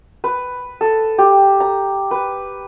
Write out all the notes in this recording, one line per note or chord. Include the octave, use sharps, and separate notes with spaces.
B4
A4
G4
A#5
B4